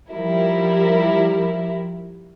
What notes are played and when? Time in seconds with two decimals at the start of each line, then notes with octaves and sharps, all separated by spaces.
0.11 F3 G3 E4 A#4